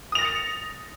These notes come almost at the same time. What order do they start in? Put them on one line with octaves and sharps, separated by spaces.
D#6 F7 A#6 A6 C#7